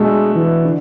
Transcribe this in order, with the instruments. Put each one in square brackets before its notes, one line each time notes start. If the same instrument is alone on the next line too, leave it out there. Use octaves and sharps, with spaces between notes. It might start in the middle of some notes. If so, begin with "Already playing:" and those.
Already playing: [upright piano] B2 A3 D4 F#4 A4 [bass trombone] G#3
[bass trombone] E3
[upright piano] D3